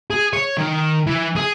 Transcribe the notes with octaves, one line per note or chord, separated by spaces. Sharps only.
G#4
C#5
D#3
E3
G#4